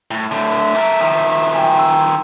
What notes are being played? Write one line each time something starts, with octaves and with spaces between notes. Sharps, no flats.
A2
A2 D3 E5
A3 A#4
D#3 F3
G5 G#5
G5 C6 E6